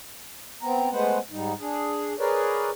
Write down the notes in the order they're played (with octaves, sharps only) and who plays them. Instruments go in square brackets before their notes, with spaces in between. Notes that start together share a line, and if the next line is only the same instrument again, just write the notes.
[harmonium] B3 C4 A#5
G#3 A3 B3 B4 C5 F#5
G#2 G3 D#4
D4 G#4
G#4 A#4 B4 C#5 D5